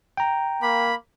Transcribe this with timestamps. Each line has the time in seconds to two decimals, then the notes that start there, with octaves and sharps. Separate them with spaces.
0.17 G5 A#5
0.62 A#3 B5